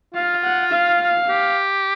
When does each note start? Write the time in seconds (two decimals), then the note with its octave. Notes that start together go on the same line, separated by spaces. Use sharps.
0.14 F4 F5
0.43 F#5
0.71 F5
1.29 G4